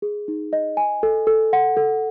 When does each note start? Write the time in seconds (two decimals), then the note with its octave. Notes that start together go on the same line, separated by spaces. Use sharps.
0.02 G#4
0.28 D#4
0.53 D#5
0.77 G#5
1.03 A4
1.27 A4
1.53 F#5
1.77 A4